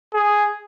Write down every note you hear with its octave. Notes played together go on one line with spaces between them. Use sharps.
G#4